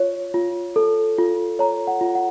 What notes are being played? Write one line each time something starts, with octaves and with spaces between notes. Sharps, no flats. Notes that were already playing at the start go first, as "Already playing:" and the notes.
Already playing: F4 C#5
F4
A4
F4
C#5 A#5
F#5
F4
F#5